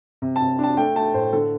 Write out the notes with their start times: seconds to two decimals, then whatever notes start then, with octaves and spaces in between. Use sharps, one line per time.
0.22 C3
0.36 A5
0.41 C3
0.59 D4 A5
0.77 A3 G5
0.95 A3 A5
1.14 A2 C5
1.33 D3 A4